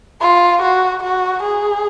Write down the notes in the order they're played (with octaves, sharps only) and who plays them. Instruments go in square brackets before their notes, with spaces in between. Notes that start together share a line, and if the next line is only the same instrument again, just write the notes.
[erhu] F4
F#4
F#4
G#4